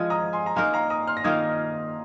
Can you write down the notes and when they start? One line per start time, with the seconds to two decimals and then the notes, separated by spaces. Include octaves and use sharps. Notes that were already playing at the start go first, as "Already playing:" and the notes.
Already playing: F3 G#3 F4 D#6 G#6
0.10 A#5 D#6
0.33 G#5 C6
0.46 A#5
0.56 A#3 D#4 A#4 G#5 C6
0.73 F5 A#5
0.90 A#5 D#6
1.07 C6 F6
1.17 A#6
1.24 D#3 A#3 F4 D#6 G#6